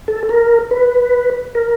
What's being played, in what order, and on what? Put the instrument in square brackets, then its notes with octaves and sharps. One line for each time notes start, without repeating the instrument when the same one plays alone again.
[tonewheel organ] A4
A#4
B4
A#4